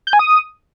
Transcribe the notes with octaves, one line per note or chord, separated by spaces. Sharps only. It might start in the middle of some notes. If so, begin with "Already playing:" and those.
G6
G#5
D#6